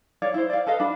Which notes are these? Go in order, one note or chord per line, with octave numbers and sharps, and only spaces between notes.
C#5 D5 F5
E4 C5
D5 F5
A4 B4 D#5 F5
D4 F#4 B5